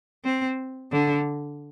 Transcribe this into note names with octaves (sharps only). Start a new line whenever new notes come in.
C4
D3